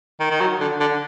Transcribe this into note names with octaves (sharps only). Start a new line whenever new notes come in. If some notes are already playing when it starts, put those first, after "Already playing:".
D#3
D#3
F#3
D3
D3